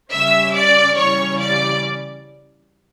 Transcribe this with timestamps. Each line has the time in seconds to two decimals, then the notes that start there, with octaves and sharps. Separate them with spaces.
0.11 C#3 G3 C#4 E5 E6
0.54 D5 D6
0.96 C#3 E3 G3 C#4 C#5 C#6
1.40 D5 D6